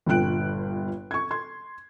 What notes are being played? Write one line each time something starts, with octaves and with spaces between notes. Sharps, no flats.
G1 G2 A#2 G5 F#6 D7
C#6 G#6
C6 G#6